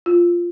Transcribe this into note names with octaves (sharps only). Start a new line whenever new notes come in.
F4